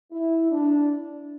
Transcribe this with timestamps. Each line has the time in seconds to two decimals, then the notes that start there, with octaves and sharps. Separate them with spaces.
0.12 E4
0.51 D4